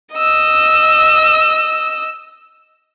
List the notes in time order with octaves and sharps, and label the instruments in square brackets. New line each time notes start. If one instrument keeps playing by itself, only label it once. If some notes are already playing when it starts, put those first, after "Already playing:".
[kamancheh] D#5 E6